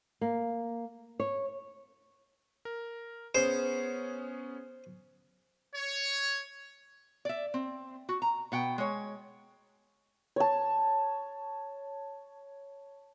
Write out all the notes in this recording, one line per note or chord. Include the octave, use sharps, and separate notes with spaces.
A#3
C#5
A#4
B3 C#4 G#4 C5
C#5
D5 E5
C4
F#4
A#5
B2 F#5 G5
G#3 C#5
C#5 A5